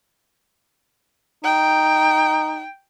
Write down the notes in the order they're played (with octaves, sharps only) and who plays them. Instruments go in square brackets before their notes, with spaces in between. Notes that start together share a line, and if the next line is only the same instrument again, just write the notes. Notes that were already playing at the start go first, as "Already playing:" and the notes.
[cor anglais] D#4 [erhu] G5